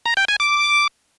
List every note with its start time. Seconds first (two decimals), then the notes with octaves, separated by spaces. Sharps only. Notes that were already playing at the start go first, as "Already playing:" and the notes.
0.06 A#5
0.17 G5
0.28 G#5
0.40 D6